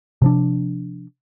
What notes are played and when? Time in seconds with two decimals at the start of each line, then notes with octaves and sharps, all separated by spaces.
0.22 C3 F3 D4